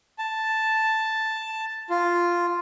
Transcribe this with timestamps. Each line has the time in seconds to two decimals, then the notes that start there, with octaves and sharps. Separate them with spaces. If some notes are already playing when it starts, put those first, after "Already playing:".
0.18 A5
1.90 F4